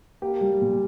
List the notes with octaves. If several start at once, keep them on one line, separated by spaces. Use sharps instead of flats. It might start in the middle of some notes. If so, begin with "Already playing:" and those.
A#3 G4
G3
A#2